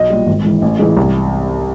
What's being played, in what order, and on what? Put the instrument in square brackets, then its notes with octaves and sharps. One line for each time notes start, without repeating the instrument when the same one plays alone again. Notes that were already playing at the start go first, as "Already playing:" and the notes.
Already playing: [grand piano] B1 D#5
A#2 G3
G#1
G#2 E3
A1
G#2 E3 G#3
C2